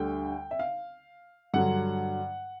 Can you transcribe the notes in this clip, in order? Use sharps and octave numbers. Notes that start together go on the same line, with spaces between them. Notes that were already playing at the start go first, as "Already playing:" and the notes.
Already playing: D2 D3 G3 G5
E5
F5
G2 D3 F#3 F#5